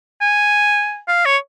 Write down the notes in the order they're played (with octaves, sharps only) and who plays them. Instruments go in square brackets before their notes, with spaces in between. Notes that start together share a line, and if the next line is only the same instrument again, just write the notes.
[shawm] G#5
F5
C#5